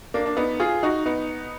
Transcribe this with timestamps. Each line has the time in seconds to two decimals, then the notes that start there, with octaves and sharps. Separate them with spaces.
0.14 A#3 D4
0.26 D4
0.37 B3 D#4
0.60 F4 G#4
0.83 D#4 F#4
1.06 B3 D#4